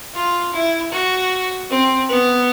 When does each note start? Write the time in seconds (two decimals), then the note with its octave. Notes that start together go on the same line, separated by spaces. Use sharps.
0.14 F4
0.53 E4
0.92 F#4
1.70 C4
2.09 B3